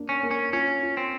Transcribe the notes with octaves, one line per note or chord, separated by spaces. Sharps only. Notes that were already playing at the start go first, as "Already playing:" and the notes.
Already playing: A#3 D4
C#4
A#3
C#4
C#4 F4
F4
C4